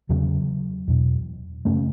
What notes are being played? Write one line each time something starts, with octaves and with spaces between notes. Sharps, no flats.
E2 C#3 F#3
E2 B2
F#2 C#3 A3 C#4